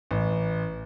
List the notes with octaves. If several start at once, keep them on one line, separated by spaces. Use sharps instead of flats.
A1